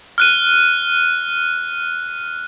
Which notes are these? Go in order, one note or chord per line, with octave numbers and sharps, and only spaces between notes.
F6 F#6 D#7